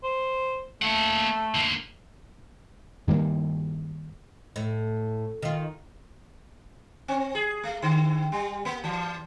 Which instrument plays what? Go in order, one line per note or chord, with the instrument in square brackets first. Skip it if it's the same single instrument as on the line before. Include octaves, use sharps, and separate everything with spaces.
[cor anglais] C5
[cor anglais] A3 [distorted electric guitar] A#3 F#5
[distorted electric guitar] D3 A#3
[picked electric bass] G2 D#3 G3 A#3
[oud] A2
D#3 F4
[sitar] C4
G#4
A3
D3
G3
A#3
E3